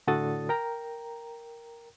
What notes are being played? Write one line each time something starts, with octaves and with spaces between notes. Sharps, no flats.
A2 D3 F#4 A4 D#6 A6
A#4 G5 A#5